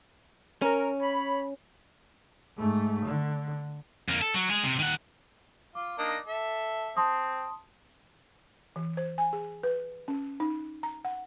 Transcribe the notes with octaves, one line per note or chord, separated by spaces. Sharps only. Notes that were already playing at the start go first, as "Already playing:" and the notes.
C#4 A#4
C#5 B5
G#2 A3
D3
F2 A#3
A4
F#3
G#3 G#4
C3
D#3 F#5
F4 D6
A#3 D4 D#4
A4 E5
C4 A5 C6 D#6
E3
C5
G#5
G#4
B4
C#4
D#4
A#5
F#5